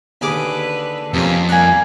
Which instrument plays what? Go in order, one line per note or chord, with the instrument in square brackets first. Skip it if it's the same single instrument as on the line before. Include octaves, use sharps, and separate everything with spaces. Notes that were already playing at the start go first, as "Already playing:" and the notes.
[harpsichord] D#2 G#4 D6 [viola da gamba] D3 B4
[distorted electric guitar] F2 [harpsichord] C3 C#4 [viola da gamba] A#3
[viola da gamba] G3 A#3 [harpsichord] A#4 [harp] G#5 F#6